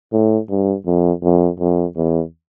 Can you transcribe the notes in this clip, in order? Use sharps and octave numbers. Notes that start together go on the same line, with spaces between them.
A2
G2
F2
F2
F2
E2